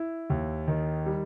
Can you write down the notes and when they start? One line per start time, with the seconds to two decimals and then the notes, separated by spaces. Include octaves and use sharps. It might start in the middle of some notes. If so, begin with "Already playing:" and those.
Already playing: E4
0.30 D#2
0.68 D#3
1.06 G3